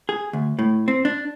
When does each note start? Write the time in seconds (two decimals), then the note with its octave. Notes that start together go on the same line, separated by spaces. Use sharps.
0.09 G#4
0.33 D2
0.59 A2
0.88 C4
1.05 D4